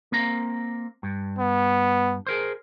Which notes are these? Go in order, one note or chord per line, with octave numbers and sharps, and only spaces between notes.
A#3 C4 A#5
G2
B3
G#4 A#4 C5